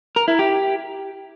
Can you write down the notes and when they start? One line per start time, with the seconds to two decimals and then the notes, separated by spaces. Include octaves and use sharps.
0.16 A#4
0.28 E4
0.39 G4